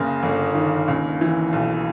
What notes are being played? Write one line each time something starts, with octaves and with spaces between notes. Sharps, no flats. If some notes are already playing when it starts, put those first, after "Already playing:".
Already playing: F#1 C#3 A#3
G1
D#3
C#2
E3
B1